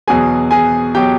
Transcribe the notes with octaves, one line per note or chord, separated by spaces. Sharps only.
E2 B2 F#3 G#4 G#5
G#4 G#5
B2 F#3 G4 G5